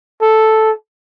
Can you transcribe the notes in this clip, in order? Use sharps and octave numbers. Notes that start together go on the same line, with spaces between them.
A4